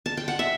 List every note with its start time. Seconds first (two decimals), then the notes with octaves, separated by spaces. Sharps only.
0.06 A5
0.17 G5
0.28 F#5
0.39 E5